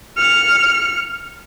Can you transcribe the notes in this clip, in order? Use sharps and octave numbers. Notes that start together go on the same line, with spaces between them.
F6 C#7